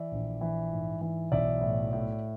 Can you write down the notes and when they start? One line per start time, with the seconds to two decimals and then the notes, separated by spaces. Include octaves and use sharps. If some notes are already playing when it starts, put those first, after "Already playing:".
Already playing: E3 D5 E5
0.12 A#1
0.41 E3
0.72 G#2
1.01 E3
1.32 B1 D5 E5
1.61 A2
1.93 A2